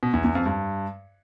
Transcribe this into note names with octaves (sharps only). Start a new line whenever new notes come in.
B2
E2
E2
F2
G2